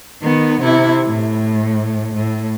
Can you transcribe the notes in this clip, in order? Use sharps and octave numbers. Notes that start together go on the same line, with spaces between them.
D#3 B3
C3 E4
A2
A2